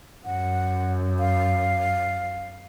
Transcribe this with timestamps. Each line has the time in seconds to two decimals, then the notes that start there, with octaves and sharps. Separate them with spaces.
0.25 F#2 F#5
1.19 F5